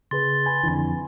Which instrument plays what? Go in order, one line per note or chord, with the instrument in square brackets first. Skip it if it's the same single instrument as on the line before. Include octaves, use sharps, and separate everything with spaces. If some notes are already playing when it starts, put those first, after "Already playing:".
[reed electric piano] C#3 G#4 B4 [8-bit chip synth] C6 A6
[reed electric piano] G#5 B5
[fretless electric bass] F2 D3 E3